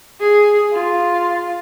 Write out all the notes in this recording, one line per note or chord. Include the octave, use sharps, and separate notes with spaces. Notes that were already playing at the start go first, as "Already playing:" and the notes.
G#4
F4